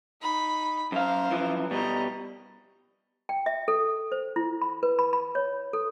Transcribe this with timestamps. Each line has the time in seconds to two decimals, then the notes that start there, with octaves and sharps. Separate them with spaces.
0.22 D#4 B5
0.92 F#2 C5 F5 A#5
1.30 F#2 E3 F3
1.71 B2 G3 D#5 A#5
3.29 G5
3.46 E5
3.68 A4
4.12 C5
4.36 E4
4.62 B5
4.83 B4
4.99 B5
5.13 B5
5.35 C#5
5.73 A4